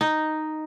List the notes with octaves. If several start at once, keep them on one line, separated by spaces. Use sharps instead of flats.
D#4